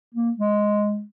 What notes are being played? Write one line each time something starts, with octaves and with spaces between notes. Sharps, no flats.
A#3
G#3